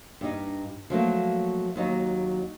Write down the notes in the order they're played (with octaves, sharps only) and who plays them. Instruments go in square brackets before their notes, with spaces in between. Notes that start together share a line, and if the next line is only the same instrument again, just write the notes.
[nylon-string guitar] G2 D#4
F3 F#3 A3 A#3
D#2 F#3 D#4